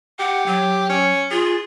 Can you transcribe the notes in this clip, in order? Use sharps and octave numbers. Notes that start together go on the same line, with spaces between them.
G4 F#5
F#3
C#4
F4 G#4